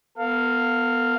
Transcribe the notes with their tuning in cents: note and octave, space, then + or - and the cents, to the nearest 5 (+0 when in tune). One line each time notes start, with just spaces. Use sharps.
B3 +0 A4 +45 F5 +0